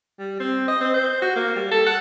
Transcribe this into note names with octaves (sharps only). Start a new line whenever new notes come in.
G3
C4
D#5
C4
C5
F#4
A#3
G3
A4
F#5